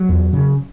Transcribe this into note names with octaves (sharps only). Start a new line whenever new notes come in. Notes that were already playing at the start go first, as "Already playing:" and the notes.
Already playing: F#3
E2
C#3